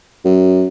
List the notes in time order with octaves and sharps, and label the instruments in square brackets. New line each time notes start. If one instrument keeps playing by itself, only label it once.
[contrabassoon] F#2